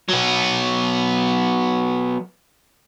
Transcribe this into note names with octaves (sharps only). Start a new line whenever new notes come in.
F#3 B3